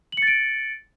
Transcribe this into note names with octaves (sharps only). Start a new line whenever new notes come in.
A6 C#7 D7 F#7